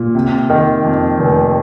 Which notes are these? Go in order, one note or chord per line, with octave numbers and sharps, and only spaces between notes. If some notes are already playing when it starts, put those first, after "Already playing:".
Already playing: A#2
C3
D#3
F2
F1